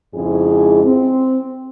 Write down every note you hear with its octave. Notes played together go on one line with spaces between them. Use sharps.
F2 G#2 C#3 G#3 E4 G#4
C4